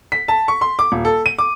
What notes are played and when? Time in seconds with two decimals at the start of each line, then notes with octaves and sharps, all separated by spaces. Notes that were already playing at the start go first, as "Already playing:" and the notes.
0.12 B6
0.28 A5
0.48 C#6
0.61 C6
0.79 D6
0.92 D#1
1.05 A4
1.26 D#7
1.39 D6